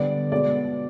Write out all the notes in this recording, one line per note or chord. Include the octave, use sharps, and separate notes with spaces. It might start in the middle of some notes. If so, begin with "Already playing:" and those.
Already playing: D3 G3 B3 D5
B2 G#3 B3 D5